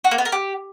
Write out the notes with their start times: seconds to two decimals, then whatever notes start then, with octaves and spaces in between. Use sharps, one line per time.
0.04 F#4
0.11 A#3
0.18 B3
0.25 A#4
0.32 G4